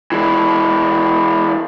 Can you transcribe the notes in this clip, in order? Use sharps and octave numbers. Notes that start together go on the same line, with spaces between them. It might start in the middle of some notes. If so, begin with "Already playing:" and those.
E3 G#3